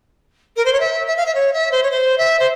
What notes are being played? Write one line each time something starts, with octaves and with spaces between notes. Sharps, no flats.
A#4
C5
C#5
E5
E5
F5
E5
C#5
E5
C5
C#5
C5
E5
C5